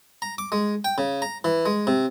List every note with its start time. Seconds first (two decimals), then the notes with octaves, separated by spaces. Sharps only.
0.22 A#5
0.38 D6
0.52 G#3
0.84 G5
0.98 C#3
1.22 A#5
1.44 E3
1.66 G#3
1.87 C3